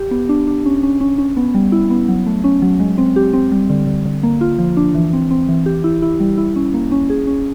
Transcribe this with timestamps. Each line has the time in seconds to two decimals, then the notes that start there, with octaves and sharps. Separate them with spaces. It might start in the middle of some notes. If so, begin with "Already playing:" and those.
Already playing: G4
0.11 B3
0.29 D4
0.47 D4
0.66 C#4
0.83 C#4
1.01 C#4
1.18 C#4
1.37 B3
1.54 G3
1.72 E4
1.90 B3
2.08 F#3
2.26 A3
2.44 C#4
2.62 F#3
2.80 G#3
2.98 C4
3.16 G4
3.33 C4
3.52 G3
3.70 D3
3.87 D3
4.05 D3
4.23 A#3
4.41 F4
4.58 F3
4.77 D4
4.94 E3
5.13 C4
5.31 C4
5.48 E3
5.66 G4
5.84 E4
6.02 E4
6.20 G3
6.37 E4
6.56 C#4
6.74 A#3
6.92 C#4
7.10 G#4
7.27 C#4